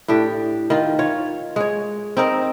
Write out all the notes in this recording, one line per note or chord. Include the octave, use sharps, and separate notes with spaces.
A2 D4 G4
D#3 F4
F4 C#5
G#3 C#5
C4 D#4 A#4